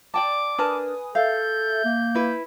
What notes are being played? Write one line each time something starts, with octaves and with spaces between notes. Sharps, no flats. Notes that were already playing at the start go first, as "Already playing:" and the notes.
D5 G5 A5 D6
D4 A#4 B4 G#5 A5 D#6
A4 E5 F5 G6
A#3
E4 B4